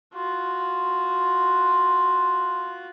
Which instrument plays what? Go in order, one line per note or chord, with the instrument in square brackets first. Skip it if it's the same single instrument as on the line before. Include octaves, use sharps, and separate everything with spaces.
[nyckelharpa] F4 F#4